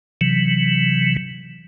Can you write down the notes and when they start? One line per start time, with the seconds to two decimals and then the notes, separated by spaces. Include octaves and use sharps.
0.21 C3 E3 F#3